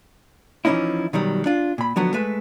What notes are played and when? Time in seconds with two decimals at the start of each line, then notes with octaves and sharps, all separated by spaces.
0.65 E3 F3 A#3 C#4 D#4 E4
1.13 B2 D#3 F#3 G3
1.46 D4 F4
1.78 A#2 B5
1.96 D3 F3 F#3 B3
2.14 G#3 A3 B4